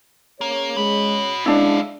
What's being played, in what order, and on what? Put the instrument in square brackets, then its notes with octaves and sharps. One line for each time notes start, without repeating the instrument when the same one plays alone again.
[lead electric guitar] A#3 [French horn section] C#4 G#4 C#5
[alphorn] G#3 [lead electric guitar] F#4 B5
[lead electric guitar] D3 F5 [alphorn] G#3 [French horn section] C#4 D#5 [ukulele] D4 E4